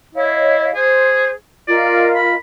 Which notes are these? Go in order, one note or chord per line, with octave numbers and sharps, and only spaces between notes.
E4 C#5 D#5 F5
G#4 C5
F4 A#4 D5 D#5
B5